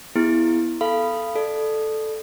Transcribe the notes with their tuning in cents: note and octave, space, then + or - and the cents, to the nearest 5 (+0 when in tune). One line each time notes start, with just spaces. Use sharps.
B3 +0 E4 +0 G#4 -25
A4 +0 F5 -25 B5 +0
A4 -5 D5 +30